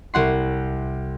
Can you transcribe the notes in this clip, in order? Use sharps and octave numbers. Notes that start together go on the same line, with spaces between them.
C2 F#5 C6